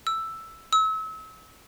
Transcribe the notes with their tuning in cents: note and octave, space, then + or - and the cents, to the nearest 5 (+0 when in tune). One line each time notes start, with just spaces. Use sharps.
E6 +5
E6 -35